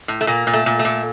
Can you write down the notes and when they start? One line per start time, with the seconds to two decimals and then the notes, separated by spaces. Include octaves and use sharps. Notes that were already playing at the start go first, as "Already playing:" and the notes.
0.08 A2
0.21 A3
0.27 A#2 A#3
0.47 A#2
0.53 A3
0.66 A#2
0.79 A3
0.85 A#2